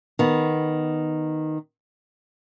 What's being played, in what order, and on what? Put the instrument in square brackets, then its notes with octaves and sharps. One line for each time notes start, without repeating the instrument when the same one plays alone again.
[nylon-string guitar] D#3 B3